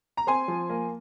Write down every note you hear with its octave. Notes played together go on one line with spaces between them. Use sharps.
A#5
C4 G#5 C6
F3
A#3